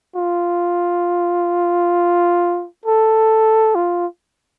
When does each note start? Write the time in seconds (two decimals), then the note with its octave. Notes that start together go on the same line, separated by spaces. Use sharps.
0.15 F4
2.85 A4
3.75 F4